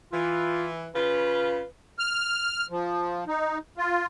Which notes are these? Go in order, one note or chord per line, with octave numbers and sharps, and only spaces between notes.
E3 F4
C#3 F4 B4
F6
F3
D#4
F4